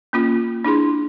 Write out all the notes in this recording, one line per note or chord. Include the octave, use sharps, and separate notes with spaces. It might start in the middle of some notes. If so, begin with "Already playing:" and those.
A#3 C#4 F4
D4 E4 G#4 C6